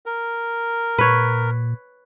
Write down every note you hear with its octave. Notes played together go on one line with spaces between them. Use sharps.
A#4
A#2 B4 C#5